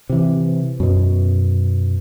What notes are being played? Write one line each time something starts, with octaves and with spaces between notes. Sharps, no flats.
C3 E3
F#2 B2